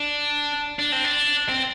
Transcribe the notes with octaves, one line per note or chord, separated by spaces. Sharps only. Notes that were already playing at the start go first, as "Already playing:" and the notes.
Already playing: D4
D4
C4
D4
C4